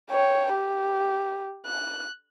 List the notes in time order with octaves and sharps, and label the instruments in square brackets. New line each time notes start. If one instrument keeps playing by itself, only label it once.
[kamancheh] C#5 G5
G4
F#6